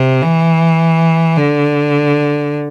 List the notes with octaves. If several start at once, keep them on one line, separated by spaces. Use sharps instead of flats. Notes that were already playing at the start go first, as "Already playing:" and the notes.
Already playing: C3
E3
D3